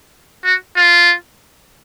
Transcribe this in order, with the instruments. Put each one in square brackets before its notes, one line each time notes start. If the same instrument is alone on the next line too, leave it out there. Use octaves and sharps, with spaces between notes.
[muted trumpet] F#4
F4